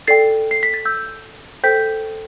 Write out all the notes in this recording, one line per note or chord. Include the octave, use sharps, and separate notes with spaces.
A4 D5 G5 A6 C7
C7
B6
A6
E6 G6
A4 C5 G5 G6 B6